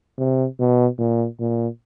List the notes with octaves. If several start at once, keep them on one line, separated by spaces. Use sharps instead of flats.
C3
B2
A#2
A#2